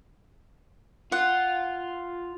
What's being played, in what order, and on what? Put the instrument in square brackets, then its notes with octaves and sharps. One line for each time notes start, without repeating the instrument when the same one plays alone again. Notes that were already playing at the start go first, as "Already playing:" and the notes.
[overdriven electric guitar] F4 [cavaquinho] F#5